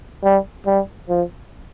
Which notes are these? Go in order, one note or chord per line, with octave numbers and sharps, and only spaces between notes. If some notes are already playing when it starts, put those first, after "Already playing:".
G3
G3
F3